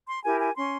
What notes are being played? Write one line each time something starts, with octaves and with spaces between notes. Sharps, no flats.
C6
E4 G4 A#4 G#5
G#5
C#4 C6